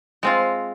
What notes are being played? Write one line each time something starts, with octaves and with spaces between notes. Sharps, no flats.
G#3 C4 F4